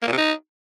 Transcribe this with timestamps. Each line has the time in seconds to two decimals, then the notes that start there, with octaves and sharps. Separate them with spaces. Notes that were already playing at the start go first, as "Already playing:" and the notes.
0.02 A#3
0.07 A#2
0.12 C3
0.17 D#4